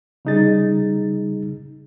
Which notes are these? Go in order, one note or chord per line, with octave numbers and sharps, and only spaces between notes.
C#3 G3 D#4 G#4 A6